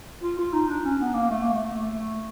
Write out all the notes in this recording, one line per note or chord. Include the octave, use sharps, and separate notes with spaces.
F4
F4
D#4
D4
C#4
B3
A#3
A3
A#3
A3